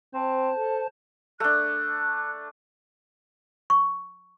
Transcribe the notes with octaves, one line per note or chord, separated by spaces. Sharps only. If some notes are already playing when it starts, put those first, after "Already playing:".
C4 C5 A5
A4
A3 D4 F#6
C#6